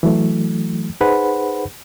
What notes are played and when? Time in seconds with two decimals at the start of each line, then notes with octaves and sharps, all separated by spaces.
0.03 E3 F#3 A3
1.01 D#4 G#4 B4 C5 F#5 B5